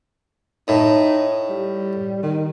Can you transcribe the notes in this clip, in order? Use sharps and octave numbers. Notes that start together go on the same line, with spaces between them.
A2 D#4
G3
D#3